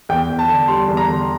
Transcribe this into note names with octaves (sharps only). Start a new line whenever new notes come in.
E2 G5
E2
A5
D3
G3 C6
E2
A#5
D3